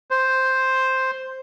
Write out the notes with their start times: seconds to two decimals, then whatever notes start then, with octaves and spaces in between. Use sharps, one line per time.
0.11 C5